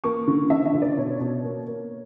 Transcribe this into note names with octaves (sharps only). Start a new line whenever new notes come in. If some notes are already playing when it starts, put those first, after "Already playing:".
A#3 C#6
D3
D3 E5
E5
D3
D5
B2 C#5
B2
A#3
A#3